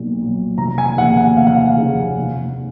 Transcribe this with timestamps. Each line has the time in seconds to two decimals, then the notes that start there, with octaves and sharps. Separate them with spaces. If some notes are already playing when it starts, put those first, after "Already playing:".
Already playing: B1 A#2 F#3
0.18 A#2 F#3
0.58 F1 A#5
0.78 G#5
0.97 D#2 C#3 F3 F#5
1.17 F#5
1.37 F1 F5
1.47 F#5
1.57 F5
1.77 D#2 C#3 F3
2.17 F1